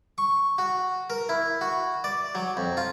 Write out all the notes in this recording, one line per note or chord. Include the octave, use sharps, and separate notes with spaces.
C#6
F#4
A#4
E4
F#4
D5
F#3
F2
F4